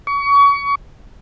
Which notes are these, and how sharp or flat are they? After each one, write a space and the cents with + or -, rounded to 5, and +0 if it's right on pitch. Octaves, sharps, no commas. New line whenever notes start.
C#6 +30